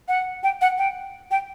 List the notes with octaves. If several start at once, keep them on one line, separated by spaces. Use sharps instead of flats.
F#5
G5
F#5
G5
G5